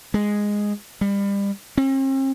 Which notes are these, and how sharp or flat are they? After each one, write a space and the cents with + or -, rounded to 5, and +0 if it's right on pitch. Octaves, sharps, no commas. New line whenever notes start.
G#3 -5
G3 +30
C4 +45